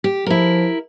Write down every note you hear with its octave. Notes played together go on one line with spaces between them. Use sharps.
G4
F3 E4 A#4